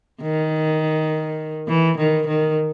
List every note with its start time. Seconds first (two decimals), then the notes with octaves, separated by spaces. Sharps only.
0.22 D#3
1.68 E3
1.98 D#3
2.27 D#3